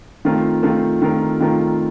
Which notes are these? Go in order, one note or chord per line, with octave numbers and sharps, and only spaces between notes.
D#3 A3 C4 F4 A#4
D#3 A3 C4 F4 A#4
D#3 A3 C4 F4 A#4
D#3 A3 C4 F4 A#4